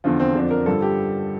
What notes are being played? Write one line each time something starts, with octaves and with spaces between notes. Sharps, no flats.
E2 D3 F3 F4
C4
F2 D3 F3 D4
A#4
G2 D3 F3 A4
G4